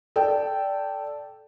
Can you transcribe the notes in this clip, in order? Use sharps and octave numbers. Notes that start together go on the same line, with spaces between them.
A4 D5 G5